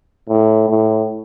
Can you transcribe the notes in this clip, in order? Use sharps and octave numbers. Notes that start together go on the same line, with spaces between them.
A2
A2